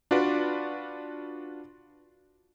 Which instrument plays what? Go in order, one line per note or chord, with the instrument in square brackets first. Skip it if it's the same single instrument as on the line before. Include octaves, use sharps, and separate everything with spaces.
[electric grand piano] D4 F4 F#4 B4 D5